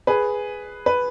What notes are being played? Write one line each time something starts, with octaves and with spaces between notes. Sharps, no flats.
G#4 B4
B4